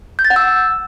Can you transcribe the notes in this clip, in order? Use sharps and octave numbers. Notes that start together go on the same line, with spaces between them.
G6
A6
F#5
E6